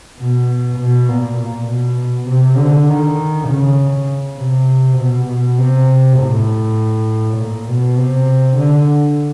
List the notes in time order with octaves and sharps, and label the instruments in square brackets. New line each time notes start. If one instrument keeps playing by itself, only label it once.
[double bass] B2
B2
A#2
A#2
B2
C3
D3
D#3
C#3
C3
B2
B2
C3
A2
A#2
B2
C3
D3